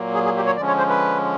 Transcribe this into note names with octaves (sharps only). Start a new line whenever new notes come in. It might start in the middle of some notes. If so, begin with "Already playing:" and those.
Already playing: A#2 F#3 A#3
G#4
G#4
G4
C#5
D3 F3 G#3 C#4 D5
C#5
C5
B4